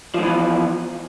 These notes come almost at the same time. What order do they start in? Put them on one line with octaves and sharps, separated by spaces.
F3 G#2 E3 E2